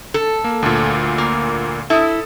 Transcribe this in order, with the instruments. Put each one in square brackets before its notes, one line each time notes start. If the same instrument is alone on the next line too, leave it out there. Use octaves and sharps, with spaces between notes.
[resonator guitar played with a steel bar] A4
[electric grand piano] A#3
D2 A#2
[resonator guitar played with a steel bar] A#3
[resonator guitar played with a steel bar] E4 [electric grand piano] A4 D#6